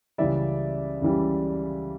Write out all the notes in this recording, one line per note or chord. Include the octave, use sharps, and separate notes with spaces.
C#2 C#3 E3 G3 D5 E5
C#2 C#3 E3 G3